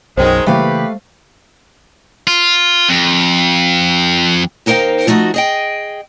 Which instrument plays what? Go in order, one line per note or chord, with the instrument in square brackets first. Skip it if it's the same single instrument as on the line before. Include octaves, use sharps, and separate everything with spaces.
[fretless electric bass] B1 F#2 F#3 [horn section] D#3 G#3 [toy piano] C5 G5
[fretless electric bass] C#3 E3 A#3 [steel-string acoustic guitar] A3 F5 [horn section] G4 B4
[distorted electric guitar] F4
F2
[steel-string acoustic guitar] D#2 D#4 A#4 C5 F5 G5
F3 A3 D#4 F4 F#4
G#4 D#5 G5